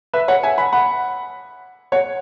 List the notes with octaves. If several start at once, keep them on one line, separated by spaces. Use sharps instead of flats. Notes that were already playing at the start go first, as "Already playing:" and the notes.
B4 E5
C#5 F#5
E5 G#5
F#5 B5
F#5 B5
C#5 F#5